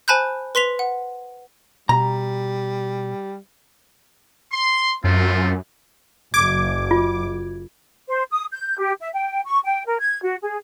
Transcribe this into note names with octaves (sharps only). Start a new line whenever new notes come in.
C5 G#5 A5 B5 F#6 G6
B4 C6 B6 F7
F#5
B2 G3 A#5
C6
F#2 A3 C4 F4
F#1 D6 G#6
F4
C5
D#6
G6
G4
E5
G5
C#6
G5
A#4
G#6
F#4
G#4